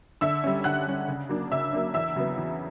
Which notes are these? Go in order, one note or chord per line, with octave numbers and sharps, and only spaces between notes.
D3 E5 E6
G3 C#4
D3 F#5 F#6
G3 C#4
C#3
F#3 A#3 D4
C#3 E5 E6
F#3 A#3 D4
E2 E5 E6
C#3 F#3 B3
E2